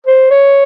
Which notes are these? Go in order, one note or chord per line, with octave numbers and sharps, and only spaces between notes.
C5
C#5